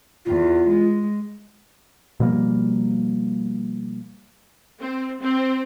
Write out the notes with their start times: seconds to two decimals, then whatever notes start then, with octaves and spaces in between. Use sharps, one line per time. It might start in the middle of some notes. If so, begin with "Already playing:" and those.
0.25 E2 F4
0.68 G#3
2.20 B2 F3 G3 A#3
4.81 C4
5.21 C4